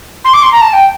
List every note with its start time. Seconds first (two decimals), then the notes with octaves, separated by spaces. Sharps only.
0.25 C6
0.34 D6
0.43 C6
0.52 A#5
0.61 A5
0.73 G5